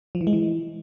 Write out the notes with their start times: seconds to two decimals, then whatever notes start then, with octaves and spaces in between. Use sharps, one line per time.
0.15 F3
0.21 E3
0.27 G#3
0.33 E3